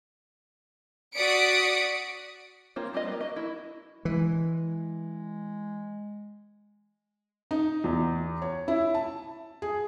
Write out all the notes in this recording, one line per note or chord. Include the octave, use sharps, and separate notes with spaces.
F#4 D5 D#6 B6 C#7 D7
A#3 C4 F4 C5 C#5
G3 C4 F4 D#5
A#3 B3
F#4 D#5
E4 F#4
E3 G#3
D#4
E2
C#5
E4
A5
G#4